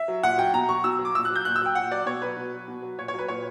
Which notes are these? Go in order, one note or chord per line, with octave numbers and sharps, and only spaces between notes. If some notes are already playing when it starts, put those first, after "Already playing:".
Already playing: E5
F#3
A#2 F#5
F#3 G5
B2 A#5
F#3 C#6
B2 E6
F#3
D6
A#2 E6
F#6
F#3
G6
A#2 F#6
E6
F#3 G5
A#2 F#5
F#3 D5
B2 C#5
F#3 B4
B2
F#3
B2
F#3
A#2 C#5
F#3 C#5
B4
A#2 C#5